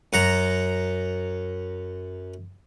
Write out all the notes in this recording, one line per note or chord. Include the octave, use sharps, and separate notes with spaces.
F#2 F#5 A#5